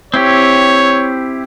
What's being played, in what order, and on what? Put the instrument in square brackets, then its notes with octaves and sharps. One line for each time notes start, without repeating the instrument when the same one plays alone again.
[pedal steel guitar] C4 E4 G4 [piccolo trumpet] C#5